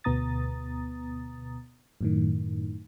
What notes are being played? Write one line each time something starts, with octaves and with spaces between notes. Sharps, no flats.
D2 B2 B3 A#5 D#6 A6
F#2 A2 D#3